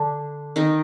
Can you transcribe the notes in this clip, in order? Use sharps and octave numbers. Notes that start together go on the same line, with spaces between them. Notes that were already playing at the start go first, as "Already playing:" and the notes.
Already playing: D3 D4
D#3 D#4